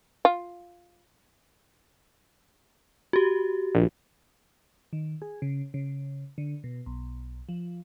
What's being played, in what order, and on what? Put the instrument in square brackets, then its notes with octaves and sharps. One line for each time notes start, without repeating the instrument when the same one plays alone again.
[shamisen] F4
[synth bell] F#4 G4
[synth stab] A#1
[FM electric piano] D#3
G#4
C#3
C#3
D3
B2
B1
F3